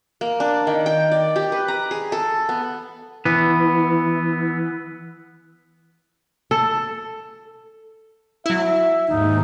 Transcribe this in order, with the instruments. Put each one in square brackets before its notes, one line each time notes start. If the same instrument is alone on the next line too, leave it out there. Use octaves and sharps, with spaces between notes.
[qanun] A#3
D4
D#3
G5
D5
G4
B4
A#5
G#4
A4
B3
[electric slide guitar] E3 [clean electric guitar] B3
[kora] A4
[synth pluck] F#3 E4 [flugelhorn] E5
[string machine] D#2 G#2 [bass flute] D#4